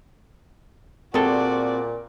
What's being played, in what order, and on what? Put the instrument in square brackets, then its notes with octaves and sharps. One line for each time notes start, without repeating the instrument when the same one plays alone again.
[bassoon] A#2 [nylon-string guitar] C4 [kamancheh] F#4 D5 [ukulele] G#4 A4